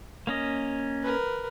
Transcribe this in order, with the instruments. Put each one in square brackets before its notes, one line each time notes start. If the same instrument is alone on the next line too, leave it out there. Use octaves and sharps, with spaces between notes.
[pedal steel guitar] A#3 C#4 D#5
[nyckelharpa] A#4 B4